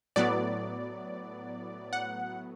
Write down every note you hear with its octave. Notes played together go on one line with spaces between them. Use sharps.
A2 F#3 B3 D5
F#5